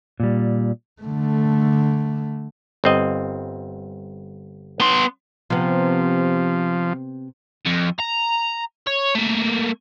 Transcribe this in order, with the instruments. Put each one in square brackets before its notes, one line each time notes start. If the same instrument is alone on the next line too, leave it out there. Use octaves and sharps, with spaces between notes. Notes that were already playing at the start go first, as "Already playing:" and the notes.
[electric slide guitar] A#2 G3
[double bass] D3 A3
[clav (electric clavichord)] G1 C4 D#5
[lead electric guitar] B3 C6
[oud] C3 B3 [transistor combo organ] F3
[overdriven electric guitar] F2
A#5
C#5
A3 A#3